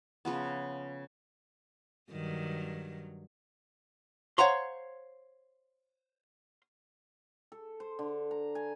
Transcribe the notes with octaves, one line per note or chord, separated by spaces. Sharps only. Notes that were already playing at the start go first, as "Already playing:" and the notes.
C#3 F3 B3
G2 D#3 F#3
C5 C#5 F5 F#5 A#5 C6
A4
C5
D3
A#5
G#5